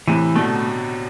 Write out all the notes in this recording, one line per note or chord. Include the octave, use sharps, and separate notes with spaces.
A2 C3 E3
B2 D3 A3